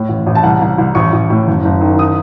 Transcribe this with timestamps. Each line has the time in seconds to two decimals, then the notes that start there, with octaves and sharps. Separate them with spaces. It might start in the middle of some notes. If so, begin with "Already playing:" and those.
Already playing: A2
0.09 A1
0.26 A1
0.35 A5
0.43 C2 F#5
0.62 C2
0.78 C2
0.95 A1 C#6
1.12 A1
1.30 A2
1.48 F#1
1.65 F#1
1.81 D#3
1.99 D#6